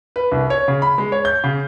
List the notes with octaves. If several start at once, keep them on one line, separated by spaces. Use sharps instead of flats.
B4
C2
C#5
C#3
B5
G#3
C#5
G6
C#3